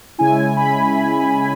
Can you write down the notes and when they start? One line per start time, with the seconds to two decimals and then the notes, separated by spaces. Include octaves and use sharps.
0.18 C#3 G#3 C#4 E4 G#5
0.57 B5